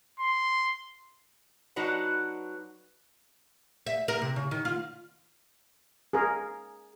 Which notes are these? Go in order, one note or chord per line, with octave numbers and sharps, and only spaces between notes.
C6
F#3 D4 D#4 F#4 B4 F#5
E5
A#4
C3
C#3
D#3
F4
G#4 A#4